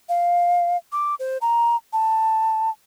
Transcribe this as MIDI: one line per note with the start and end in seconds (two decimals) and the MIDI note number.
0.09 0.77 77
0.92 1.15 86
1.19 1.38 72
1.41 1.76 82
1.93 2.70 81